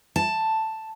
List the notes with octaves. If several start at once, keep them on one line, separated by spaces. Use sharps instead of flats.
A5